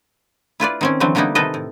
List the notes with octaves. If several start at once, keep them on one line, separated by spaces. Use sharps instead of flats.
E4 F4 B4 D5
D#3 C4 C#4
D3 E3 F#3 C4
D3 G3 A#3 B3 D#4 E4
C3 D#3 D#4 A4 B4 D#5
A2